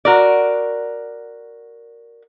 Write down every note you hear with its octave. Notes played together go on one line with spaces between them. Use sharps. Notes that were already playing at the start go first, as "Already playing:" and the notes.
F#4 A#4 D5